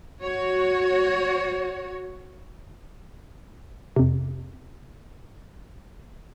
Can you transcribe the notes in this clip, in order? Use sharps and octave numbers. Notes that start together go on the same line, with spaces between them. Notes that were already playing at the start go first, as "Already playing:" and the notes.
F#4 C#5
F2 C3